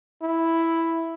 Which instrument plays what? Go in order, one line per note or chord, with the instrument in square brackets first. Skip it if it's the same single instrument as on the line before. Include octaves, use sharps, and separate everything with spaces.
[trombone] E4